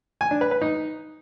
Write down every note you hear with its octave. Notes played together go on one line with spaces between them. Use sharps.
G#5
D4
B4
B4
D#4